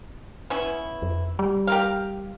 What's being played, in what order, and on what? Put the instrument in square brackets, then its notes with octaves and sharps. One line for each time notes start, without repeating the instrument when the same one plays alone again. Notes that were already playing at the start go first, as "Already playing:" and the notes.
[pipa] B3 C#4 E4
[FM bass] F2
G3
[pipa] G4 A#4 F5